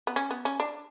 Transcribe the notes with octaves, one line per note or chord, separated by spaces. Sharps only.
B3
C#4
B3
C#4
D4